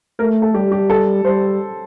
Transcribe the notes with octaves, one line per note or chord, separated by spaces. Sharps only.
A3 A#4
A4
G3 G4
G4
A4
G3 C5